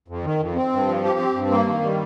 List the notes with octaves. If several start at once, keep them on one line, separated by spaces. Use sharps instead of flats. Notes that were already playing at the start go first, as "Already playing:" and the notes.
F2
D#3
F2
C4
G2
F3
G4
C4
G2
A#3
D#3
G3